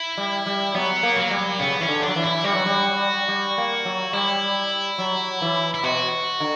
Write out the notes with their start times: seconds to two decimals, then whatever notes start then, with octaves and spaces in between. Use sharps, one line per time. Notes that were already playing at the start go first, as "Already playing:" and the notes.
Already playing: E4
0.17 G3
0.46 G3
0.75 F#3 B3
1.03 A#3
1.17 F#3 A#3
1.31 G3
1.59 C#3 B3
1.80 E3 C#4
1.88 D3
2.02 D4
2.08 F#3
2.16 E3
2.23 E4
2.44 G3 F#4
2.55 F#3
2.66 G3
3.28 G3
3.58 A#3
3.85 F#3
4.13 G3 E4
4.98 F#3
5.42 E3
5.74 E4
5.83 B2 F#4
6.40 D3